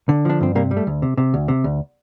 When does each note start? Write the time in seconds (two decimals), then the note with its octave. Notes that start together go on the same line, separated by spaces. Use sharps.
0.09 D3
0.25 F3 D4
0.41 G2 C4
0.55 C3 G3 A#3
0.71 G3
0.77 A3
0.87 D2
1.02 C3
1.17 C3
1.34 D2
1.48 C3
1.64 D2